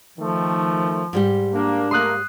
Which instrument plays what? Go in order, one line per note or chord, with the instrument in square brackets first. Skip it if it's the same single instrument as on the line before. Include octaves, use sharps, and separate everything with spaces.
[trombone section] D#3 A3 [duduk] F3
[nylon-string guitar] G#2 G3 G4
[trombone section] A#3 [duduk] D4
[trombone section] A3 A#3 [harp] C6 D#6 F#6